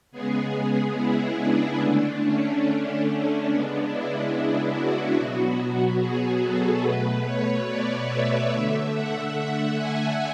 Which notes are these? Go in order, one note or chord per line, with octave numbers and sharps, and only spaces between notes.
C#3 G#3 B3 G#4
E4
D4
D3 A3
C#4
D4
C#3 G#3 B3
E4
F#4
B2 F#3 B3 F#4
F#4
G#4
A4
B2 A3 B4
C#5
D5
E5
D3 A3
F#5
F#5
G#5